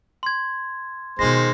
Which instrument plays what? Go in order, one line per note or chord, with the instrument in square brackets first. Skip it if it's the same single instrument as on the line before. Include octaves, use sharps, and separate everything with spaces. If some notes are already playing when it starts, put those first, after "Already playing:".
[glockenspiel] C6 G#6
[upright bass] B2 F4 [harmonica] D#3 G#3 C5 [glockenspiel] A#6